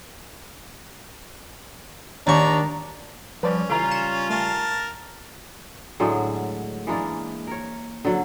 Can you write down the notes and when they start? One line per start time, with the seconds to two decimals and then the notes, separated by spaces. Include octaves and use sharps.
2.27 D#2 D4 A#5 C#6
3.43 F3 G3 C#4 B4 C5 D5
3.69 C#3 E3 G3 A3 F4 A#5
3.91 C#7 E7
4.30 A3 A#4 G#5 A5 C#6
6.00 A2 D3 F#3 G#3
6.87 E3 G#3 A#3 D4
7.47 A#4 C#5
8.05 D3 F#3